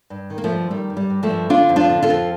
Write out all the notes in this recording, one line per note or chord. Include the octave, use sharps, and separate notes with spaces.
G2
D#3
A#3
F3 A3
G2
D#3 G3
G2
G3
G2
F3 A3
G2
D3 D4 F4
F2
D4 F4
D3
F4 A4
F2